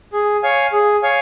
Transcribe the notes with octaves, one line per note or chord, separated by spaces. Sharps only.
G#4
C#5 F5 G#5
G#4
C#5 F5 G#5